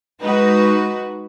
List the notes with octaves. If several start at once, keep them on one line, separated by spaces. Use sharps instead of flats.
G#3 D#4 F#4 B4